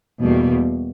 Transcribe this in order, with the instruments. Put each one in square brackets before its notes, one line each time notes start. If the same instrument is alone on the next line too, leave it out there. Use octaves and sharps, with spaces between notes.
[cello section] E2 B2 G3 A#3